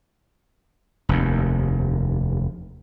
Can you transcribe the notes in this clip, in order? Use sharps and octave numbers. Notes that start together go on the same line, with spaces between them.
F1 D#2